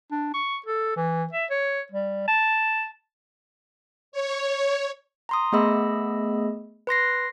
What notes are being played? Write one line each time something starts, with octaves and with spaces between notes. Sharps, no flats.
D4
C#6
A4
E3
E5
C#5
G3
A5
C#5
A#5 C6 D#6
A3 B3 G#4 D#5 B5 E6
B4 C6 A#6 C7